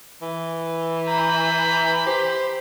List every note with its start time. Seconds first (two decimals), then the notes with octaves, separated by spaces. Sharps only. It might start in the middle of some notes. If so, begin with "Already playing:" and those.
0.22 E3
1.07 A#5 B5 G6
2.06 G4 C5